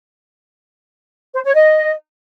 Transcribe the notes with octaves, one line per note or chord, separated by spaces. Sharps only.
C5
C#5
D#5